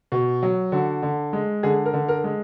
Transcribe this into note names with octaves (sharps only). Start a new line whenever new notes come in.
B2
F#3
D3 F#4
D3
G#3
D3 G#4
A#4
D3
A#4
G#3